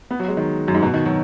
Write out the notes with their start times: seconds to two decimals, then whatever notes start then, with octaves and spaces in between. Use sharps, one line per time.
0.11 B3
0.20 F#3
0.28 G#3
0.37 D#3
0.68 F#2
0.75 G#2
0.82 B2
0.94 D#3
1.05 F#3